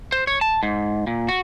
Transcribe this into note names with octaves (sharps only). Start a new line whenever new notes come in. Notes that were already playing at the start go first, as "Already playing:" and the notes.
C5
C#5
A5
G#2
A#2
F#4